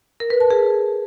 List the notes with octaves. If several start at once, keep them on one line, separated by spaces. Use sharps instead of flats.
A#4
B4
A5
G#4